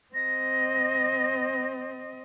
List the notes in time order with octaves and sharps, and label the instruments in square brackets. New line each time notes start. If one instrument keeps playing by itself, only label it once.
[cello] C4 D#5 [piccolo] A#6